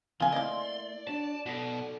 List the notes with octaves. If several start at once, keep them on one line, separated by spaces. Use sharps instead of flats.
C#3 F3 C4 F4 G#5 C6
A3 A#3 E4 D5 D#5 F5
D4 F#4 C#5 A5
B2 D#4 F#4 A4 D5